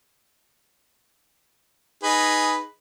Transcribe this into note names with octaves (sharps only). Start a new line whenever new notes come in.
D#4 G#4 B4